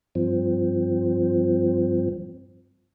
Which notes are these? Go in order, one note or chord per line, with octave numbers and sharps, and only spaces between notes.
G2 F3 C4